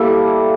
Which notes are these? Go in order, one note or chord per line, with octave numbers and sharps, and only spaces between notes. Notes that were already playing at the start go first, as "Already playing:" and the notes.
Already playing: G3 A#3 E4 A4